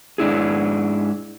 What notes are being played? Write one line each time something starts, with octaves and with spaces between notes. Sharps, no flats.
G#2 D4 E4 G#4